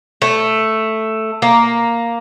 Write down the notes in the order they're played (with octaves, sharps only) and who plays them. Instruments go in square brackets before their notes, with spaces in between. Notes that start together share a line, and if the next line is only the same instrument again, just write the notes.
[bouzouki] A3
A#3